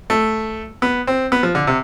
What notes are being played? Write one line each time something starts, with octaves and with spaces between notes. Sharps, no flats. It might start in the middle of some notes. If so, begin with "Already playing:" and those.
A3
B3
C4
B3
F3
D3
C3